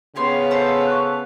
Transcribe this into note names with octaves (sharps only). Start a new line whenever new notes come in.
C#3 B3 G4 C#5 F5 C6
A4 C5 E5
C#6 F#6